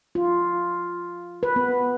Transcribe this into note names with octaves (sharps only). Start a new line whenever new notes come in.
F4
B4
B3